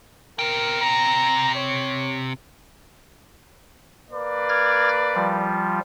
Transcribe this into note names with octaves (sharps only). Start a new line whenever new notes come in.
C3 A#4 G5
A#5
C#5
A#3 B4 D5
F6 G#6 A#6
F3 G3 F4